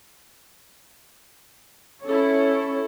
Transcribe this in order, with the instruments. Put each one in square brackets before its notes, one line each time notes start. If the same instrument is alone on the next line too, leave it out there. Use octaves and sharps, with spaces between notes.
[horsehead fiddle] C#4 C#5 [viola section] E4 A4